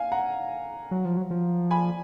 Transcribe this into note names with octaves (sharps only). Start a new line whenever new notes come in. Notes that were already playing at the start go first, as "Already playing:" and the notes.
Already playing: F5 G#5
F#5 A#5
F#3
F3
F#3
F3
G#5 B5